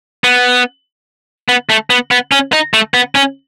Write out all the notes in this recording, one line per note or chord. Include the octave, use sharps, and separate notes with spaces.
B3
B3
A3
B3
B3
C#4
D#4
A3
B3
C#4